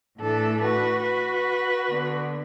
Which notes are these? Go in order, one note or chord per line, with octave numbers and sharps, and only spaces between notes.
A2 E3 A3 D4 A4
F#4 B4
F#4 B4
D3 B3 D4